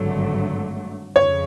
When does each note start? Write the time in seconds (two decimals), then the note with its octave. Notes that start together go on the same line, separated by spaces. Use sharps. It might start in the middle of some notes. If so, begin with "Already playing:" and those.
Already playing: G#1 G2 D3 F#3 A3
1.15 F2 C#3 C#5